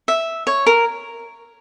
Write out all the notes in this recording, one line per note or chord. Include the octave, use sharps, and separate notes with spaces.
E5
C#5
A#4